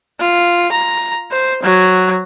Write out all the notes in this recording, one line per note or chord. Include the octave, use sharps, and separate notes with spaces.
F4
A#5
C5
F#3